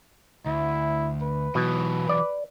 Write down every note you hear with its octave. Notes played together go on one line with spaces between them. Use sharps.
D2 E4
B4
B2 E3 F#3
D5